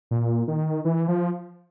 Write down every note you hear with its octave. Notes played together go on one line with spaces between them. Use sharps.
A#2
D#3
E3
F3